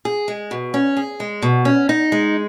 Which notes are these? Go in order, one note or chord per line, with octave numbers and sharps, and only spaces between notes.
G#4
G#3
B2
C#4
G#4
G#3
B2
C#4
D#4
G#3